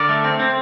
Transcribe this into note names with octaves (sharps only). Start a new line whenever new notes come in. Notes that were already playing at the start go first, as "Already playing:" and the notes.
Already playing: D3 A#4 D5
A3
C4
C4